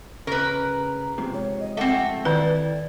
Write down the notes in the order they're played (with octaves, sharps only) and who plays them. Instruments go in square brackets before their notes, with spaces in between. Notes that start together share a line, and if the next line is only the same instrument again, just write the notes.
[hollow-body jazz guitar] C#3 [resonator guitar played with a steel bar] A#4 B4 [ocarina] A#5
[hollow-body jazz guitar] G#2 C3 F3
[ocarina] C#5
D#5
[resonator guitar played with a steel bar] A3 C4 [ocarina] F#5
[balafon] D#3 B4 [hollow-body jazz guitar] E4 [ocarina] D5